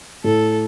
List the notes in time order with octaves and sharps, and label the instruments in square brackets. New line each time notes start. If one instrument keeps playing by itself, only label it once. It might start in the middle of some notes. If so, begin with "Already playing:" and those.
[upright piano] A2 [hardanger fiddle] A4